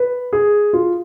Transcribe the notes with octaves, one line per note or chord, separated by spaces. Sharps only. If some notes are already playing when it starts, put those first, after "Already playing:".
Already playing: B4
G#4
F4